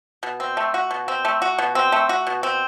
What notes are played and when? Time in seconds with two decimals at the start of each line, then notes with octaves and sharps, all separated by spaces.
0.23 B2
0.40 C4
0.57 A3
0.74 F#4
0.91 B2
1.08 C4
1.25 A3
1.42 F#4
1.58 B2
1.75 C4
1.92 A3
2.09 F#4
2.27 B2
2.43 C4